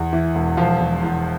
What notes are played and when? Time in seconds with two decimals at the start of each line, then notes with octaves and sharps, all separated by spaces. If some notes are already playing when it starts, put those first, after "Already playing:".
Already playing: E2
0.13 E3
0.35 E1
0.57 E1 F3 F4
0.80 E1
1.03 E2